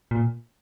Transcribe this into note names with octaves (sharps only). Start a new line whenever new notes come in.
A#2